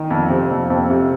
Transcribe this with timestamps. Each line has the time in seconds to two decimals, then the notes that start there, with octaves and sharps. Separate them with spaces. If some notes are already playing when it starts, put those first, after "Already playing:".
Already playing: D#3 D#4
0.11 F2
0.30 C3 C4
0.50 F2
0.70 F2 C4
0.90 C3